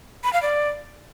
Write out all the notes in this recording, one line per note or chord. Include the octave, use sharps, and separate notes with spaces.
B5
F5
D5